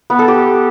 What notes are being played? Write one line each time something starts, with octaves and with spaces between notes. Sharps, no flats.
B3
A4
G4